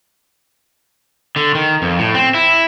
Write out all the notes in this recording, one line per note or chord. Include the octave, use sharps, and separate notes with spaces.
D3
D#3
F2
A2
C4
E4